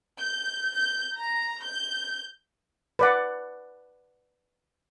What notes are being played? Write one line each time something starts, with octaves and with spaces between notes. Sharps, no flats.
G6
G6
A#5
G6
B4 D5 F#5